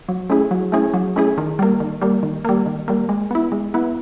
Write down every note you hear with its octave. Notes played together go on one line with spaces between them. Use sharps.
F#3
A3 C#4 E4 G#4
F#3
A3 C#4 E4 G#4
F#3
A3 C#4 E4 G#4
D#3
G3 A#3
D#3
G3 A#3
D#3
G3 A#3
D#3
G3 A#3
G#3
B3 E4
G#3
B3 E4